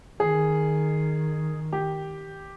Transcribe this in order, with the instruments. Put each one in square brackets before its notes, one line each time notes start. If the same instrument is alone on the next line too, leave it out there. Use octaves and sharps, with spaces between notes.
[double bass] D#3 [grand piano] G#4
[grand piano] G4